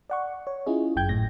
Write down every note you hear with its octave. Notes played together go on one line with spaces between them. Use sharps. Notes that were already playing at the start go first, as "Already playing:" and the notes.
D5 F#5 C#6
C#5
C#4 E4 F4 G#4 D#5
G1 F#2 G5 G6 G#6
G#1 A2 A#6